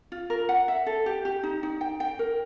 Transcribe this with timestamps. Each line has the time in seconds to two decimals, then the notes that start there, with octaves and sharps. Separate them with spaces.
0.12 F4
0.30 A#4
0.49 F#5
0.68 E5
0.87 A4
1.06 G4
1.25 G4
1.43 D#4
1.63 D#4
1.81 G5
2.00 G5
2.19 A#4